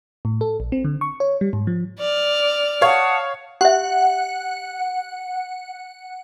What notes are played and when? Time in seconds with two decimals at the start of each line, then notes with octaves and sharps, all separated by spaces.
0.25 A2
0.41 A4
0.60 A#1
0.72 C4
0.85 D3
1.01 C#6
1.20 C#5
1.41 G3
1.53 G#2
1.67 F3
2.00 D5 F6
2.81 C#5 F5 F#5 A5 D#6
3.61 G4 E5 F#5